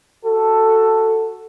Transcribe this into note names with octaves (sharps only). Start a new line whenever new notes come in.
F#4 A4